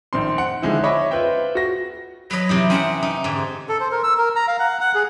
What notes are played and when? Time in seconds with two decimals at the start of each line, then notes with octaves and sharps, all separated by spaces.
0.13 A#1 D#3 C4 C6
0.38 F#5
0.62 D3 D#3 F3 G#3 C4 E4
0.84 C#5 D#5 E5 B5 D6
1.11 F4 B4 C5 E5 G5
1.55 F#4 A#6
2.31 F#3 B4 D#5
2.49 C3 E3 D#4
2.70 C4 C#4 F#5
3.03 D#4
3.24 G#2 D3
3.69 A4
3.80 C5
3.92 A#4
4.03 E6
4.18 A#4
4.36 A#5
4.48 F5
4.59 F#5
4.81 F#5
4.95 G#4